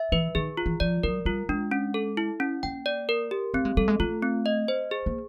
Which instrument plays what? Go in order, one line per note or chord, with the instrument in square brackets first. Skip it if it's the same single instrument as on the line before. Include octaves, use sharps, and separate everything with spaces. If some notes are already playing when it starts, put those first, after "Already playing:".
Already playing: [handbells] E5
[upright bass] E3 [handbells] B4
[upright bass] D#3 [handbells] G#4
[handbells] F4
[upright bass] E3
[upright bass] F3 [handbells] D5
[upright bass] F#3 [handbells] A#4
[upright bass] G3 [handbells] F4
[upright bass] G#3 [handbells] D4
[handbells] C#4
A4
E4
C#4
[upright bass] A#3 [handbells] G5
[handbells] D5
A#4
G4
[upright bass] A3 [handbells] C4
[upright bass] G#3
[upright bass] G3 [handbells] A4
[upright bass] G#3
[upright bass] A3 [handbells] F4
[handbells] C4
D#5
C5
G#4
[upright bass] A#3